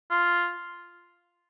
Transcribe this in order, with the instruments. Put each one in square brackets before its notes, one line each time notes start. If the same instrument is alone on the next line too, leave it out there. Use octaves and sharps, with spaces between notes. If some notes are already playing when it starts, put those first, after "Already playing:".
[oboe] F4